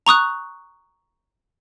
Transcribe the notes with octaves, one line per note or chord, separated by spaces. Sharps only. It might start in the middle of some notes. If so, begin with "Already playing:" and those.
A#5 C#6 D#6 F#6